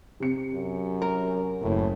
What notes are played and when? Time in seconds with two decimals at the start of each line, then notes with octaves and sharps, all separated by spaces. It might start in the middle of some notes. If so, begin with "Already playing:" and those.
0.20 C3 C#7
0.54 F#2
1.02 A#4
1.62 F#1 A2